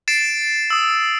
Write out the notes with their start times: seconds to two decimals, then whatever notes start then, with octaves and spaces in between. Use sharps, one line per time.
0.08 A6 C7 D7 E7
0.70 D#6 E6